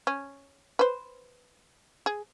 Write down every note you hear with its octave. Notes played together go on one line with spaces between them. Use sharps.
C#4
B4 C5
G#4